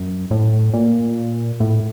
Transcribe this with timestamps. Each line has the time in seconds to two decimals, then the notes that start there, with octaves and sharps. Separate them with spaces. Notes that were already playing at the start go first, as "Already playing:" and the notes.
Already playing: F#2
0.31 A2
0.74 A#2
1.60 A2